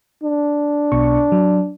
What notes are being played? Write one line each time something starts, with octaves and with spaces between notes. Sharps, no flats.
D4
B1 B2 C#6
F#3